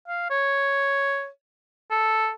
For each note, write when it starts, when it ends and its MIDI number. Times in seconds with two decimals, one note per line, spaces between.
0.08 0.29 77
0.30 1.28 73
1.91 2.31 69